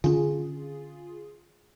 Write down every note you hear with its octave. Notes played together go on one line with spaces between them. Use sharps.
D3 C#4 F4 G#4